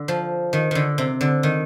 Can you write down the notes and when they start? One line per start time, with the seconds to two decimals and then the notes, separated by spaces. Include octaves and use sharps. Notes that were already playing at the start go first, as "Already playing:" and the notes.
Already playing: D3
0.08 F3
0.53 D#3
0.71 D3 D#3
0.98 C3
1.21 D3
1.43 D#3